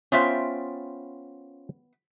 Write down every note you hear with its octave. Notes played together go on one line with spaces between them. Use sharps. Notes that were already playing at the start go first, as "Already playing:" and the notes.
B3 C#4 F4 C5 E5 G5